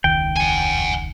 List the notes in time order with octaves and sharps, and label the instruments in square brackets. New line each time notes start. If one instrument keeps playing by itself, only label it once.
[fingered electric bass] E1 C#2 D#3 [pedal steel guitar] G5
[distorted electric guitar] F#5 G#5